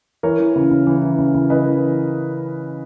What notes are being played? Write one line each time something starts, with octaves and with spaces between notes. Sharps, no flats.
E3 A#4 C#5
E3
C#3
C#3
E3
E3
C#3
C#3
E3 B4 D#5
E3